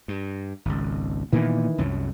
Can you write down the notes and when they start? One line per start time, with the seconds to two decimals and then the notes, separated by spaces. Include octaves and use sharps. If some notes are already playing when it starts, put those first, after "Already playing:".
0.08 G2
0.65 G#1 C#2
1.33 A#2 D#3 E3 A#3 B3
1.78 C2 F#2 F#3